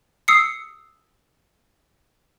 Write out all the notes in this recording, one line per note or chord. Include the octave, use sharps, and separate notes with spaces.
D#6 E6 C7 C#7